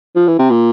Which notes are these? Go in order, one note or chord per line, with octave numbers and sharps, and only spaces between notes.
F3
E3
C3
A#2